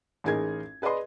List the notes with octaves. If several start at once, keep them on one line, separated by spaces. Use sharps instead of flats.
A1 D#4 G#4 A#4 G#6
G#4 B4 D5 D#5 C6